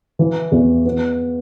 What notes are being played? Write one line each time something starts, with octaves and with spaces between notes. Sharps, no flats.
E3
E2
B3